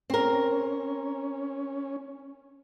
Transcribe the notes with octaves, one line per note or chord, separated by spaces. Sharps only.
C4 C#4 A#4